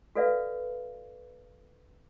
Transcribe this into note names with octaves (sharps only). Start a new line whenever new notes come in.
F#4 A4 B4 D5 E5 F5